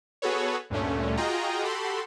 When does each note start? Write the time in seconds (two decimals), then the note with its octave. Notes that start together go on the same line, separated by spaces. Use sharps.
0.22 B3 F#4 G#4 A4 B4 C#5
0.70 D2 G2 A#2 D3 A3 C#4
1.17 F4 F#4 G#4 D#5 G5 A#5
1.62 F#4 G4 A4 B5 C6